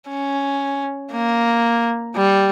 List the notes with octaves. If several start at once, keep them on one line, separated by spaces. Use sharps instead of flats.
C#4
A#3
G3